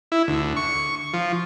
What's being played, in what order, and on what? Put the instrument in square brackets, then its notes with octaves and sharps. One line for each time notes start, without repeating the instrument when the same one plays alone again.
[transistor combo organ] E4
D2
C#6
F3